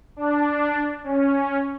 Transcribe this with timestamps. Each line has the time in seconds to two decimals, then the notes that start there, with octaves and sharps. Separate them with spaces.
0.16 D4
1.04 C#4